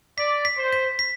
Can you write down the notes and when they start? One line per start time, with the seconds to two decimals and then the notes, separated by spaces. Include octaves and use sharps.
0.18 D5 B6
0.45 B6
0.58 C5
0.73 B6
0.99 B6